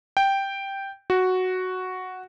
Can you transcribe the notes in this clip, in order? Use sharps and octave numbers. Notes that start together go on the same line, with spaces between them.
G5
F#4